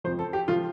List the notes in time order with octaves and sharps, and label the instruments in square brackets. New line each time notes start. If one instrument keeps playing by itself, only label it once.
[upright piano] F2 F3 C5
A4
G4
F3 F4